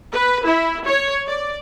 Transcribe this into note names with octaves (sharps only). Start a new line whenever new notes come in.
B4
E4
C#5
D5